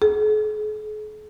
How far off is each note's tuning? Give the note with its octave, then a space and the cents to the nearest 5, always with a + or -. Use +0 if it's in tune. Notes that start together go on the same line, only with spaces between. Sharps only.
G#4 +45